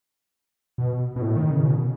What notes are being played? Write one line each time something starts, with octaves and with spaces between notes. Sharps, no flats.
B2
B2
A2
D#3
C#3
B2